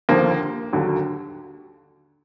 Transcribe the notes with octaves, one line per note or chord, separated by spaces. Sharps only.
D#2 D3 F3 A#3
D#2 D3 F#3